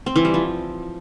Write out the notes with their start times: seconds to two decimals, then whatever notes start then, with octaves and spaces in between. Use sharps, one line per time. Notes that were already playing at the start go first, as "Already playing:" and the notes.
0.06 C4
0.16 E3
0.25 G3
0.34 F3